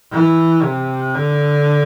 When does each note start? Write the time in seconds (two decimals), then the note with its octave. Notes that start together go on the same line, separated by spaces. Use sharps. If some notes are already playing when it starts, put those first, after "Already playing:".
0.12 E3
0.63 C3
1.14 D3